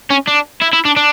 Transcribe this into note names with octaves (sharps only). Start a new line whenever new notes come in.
C#4
D4
E4
E4
D4
D4